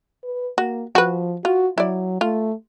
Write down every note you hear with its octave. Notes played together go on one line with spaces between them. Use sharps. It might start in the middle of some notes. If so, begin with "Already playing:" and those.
B4
A#3 F#4
F3 F#4 B4
F4 F#4
F#3 E4 D5
A3 F4